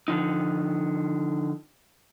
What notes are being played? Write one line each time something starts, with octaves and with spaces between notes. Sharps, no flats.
D3 F3 D#4